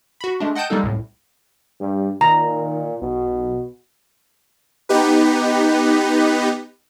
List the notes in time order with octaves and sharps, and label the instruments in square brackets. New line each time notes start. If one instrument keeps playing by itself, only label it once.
[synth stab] F#4 B5
G#3 A3 D4
D#5 F#5 G5 A5 G6 D#7
G3 G#3 A#3 D#4 A4
C2 A2
[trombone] G2 [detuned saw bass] G3
[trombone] A#2 [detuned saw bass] D#3 [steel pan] A#5
[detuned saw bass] B1 [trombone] B2
[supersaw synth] B3 D#4 G4 B4